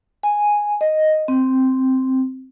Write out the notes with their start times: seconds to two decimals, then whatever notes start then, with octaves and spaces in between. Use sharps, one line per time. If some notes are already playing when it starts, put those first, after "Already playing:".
0.23 G#5
0.81 D#5
1.28 C4